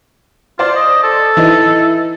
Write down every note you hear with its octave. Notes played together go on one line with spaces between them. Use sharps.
F4 C5 D5 C6
D#5
A4
E3 D#4 E4